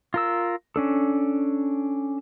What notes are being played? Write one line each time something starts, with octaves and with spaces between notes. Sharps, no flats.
F4 A#4 E6
C#4 D4 A4